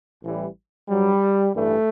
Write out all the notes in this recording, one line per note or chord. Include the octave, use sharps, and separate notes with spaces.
A1 A2 E3 G3
G2 F#3 G3
A1 G2 E3 G3 A3